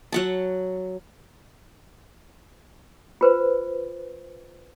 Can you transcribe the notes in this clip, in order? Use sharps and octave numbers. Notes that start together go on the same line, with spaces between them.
F#3 F#5 A5
F4 B4 C5